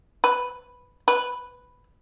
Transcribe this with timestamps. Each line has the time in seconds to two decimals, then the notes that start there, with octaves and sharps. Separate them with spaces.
0.24 B4
1.08 B4